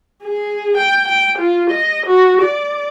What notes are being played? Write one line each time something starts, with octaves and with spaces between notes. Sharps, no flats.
G#4
G5
G5
F4
D#5
F#4
D5